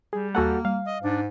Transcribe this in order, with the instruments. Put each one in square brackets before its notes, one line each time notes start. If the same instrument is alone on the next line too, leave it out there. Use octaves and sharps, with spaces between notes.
[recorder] G3 [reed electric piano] G#4
[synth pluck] D#2 G#5 A#5 [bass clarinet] A#3 [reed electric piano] F#4 A4 F#5
[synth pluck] G3 [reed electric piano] F5
[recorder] D#5
[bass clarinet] G#2 [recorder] D4